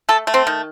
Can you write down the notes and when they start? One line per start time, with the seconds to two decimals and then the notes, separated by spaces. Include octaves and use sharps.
0.09 A3 A4
0.27 A3
0.34 C4
0.47 D#3